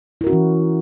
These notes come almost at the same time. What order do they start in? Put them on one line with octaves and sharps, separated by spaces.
E4 A#4 F#4 C#4 E3